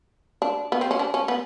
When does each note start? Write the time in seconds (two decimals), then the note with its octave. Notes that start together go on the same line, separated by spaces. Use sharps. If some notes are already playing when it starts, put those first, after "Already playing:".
0.42 D4
0.72 B3
0.81 C4
0.91 C#4
0.99 D4
1.14 C#4
1.28 B3